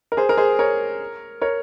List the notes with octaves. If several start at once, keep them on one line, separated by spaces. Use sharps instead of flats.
A#4
G#4 C5
A#4
G#4 C5
A#4 C#5
A#4 C#5